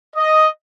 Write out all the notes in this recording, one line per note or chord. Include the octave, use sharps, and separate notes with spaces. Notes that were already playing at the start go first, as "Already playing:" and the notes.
D#5